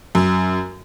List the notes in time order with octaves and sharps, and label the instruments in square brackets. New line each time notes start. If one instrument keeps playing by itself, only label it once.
[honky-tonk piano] F#2